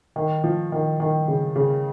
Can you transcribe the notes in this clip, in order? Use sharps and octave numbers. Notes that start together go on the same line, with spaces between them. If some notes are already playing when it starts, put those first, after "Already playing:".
D#3
F3
D#3
D#3
C#3
C#3